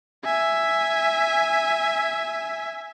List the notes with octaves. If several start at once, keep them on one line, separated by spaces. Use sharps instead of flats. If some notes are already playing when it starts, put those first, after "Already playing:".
E5 G#5